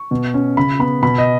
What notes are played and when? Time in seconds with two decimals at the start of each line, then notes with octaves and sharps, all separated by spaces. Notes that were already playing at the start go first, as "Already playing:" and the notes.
Already playing: C#6
0.11 B2
0.34 C#4
0.57 C#3 B5
0.80 B3 B5
1.03 B2 B5
1.18 D#5